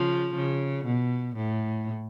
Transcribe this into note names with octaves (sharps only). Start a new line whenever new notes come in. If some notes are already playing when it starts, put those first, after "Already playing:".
Already playing: C#3 F3
C#3
B2
A2